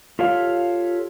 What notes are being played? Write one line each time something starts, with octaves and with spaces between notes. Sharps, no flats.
F4 G4 A4 C#5 F5